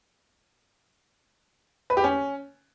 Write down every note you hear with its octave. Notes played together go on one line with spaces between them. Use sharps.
B4
G4
C#4